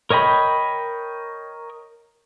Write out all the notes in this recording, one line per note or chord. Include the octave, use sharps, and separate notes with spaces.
A#4 C#5 D#5 G5 B5